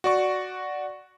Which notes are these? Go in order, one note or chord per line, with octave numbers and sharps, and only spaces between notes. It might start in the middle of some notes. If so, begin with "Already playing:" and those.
F#4 D5 C#6